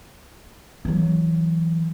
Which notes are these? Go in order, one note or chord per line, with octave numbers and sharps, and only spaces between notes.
E3 F#3